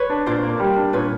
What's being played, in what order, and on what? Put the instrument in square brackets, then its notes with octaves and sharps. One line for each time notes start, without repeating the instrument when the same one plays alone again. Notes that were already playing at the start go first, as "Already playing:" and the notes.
Already playing: [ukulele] B4 C#5
[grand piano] D4
[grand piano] A#2 [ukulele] C5 D5
[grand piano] A#3
G3
D4
[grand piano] A#2 [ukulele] B4 C#5